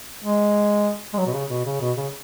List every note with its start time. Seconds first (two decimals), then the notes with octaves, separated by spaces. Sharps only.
0.24 G#3
1.13 G#3
1.18 F#3
1.26 B2
1.34 C#3
1.50 B2
1.65 C#3
1.81 B2
1.96 C#3